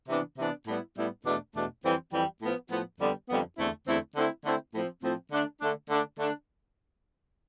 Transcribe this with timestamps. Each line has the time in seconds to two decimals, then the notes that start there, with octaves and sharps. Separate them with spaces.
0.09 C3 E3 B3 D4
0.38 C3 E3 B3 D4
0.67 A2 G3 B3 E4
0.96 A2 G3 B3 E4
1.25 E2 B2 A3 D4
1.54 E2 B2 A3 D4
1.83 F2 E3 G3 C4
2.12 F2 E3 G3 C4
2.41 A2 F3 B3
2.71 A2 F3 B3
3.00 F2 D3 G3 B3
3.28 F2 D3 G3 B3
3.58 E2 D3 A3 C4 E4
3.87 E2 D3 A3 C4 E4
4.16 D3 A3 C4 E4
4.45 D3 A3 C4 E4
4.73 A2 F3 C4
5.03 A2 F3 C4
5.32 D3 A3 D4
5.61 D3 A3 D4
5.90 D3 A3 D4
6.19 D3 A3 D4